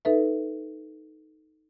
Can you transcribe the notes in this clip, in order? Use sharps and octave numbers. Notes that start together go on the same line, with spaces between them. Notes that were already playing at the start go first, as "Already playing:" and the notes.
D#4 A4 B4 E5